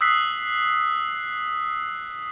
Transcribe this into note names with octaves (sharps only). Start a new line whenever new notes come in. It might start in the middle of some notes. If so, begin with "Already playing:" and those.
D#6 E6 F#6 B6 C7